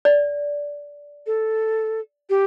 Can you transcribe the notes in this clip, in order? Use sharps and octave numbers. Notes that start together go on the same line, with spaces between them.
D5
A4
G4